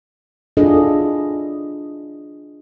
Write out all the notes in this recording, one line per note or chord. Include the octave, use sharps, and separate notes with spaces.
D4 E4 F4 G#4 A4 D#5